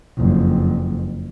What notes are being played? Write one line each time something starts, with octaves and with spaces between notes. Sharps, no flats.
F#1 F2